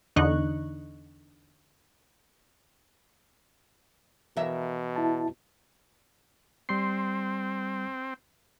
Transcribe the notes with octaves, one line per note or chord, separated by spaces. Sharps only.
E2 D3 D#4 D#5 C#6 F#6
B2 E3 A#4 E5
E4 A5
G3 C4 C6 C7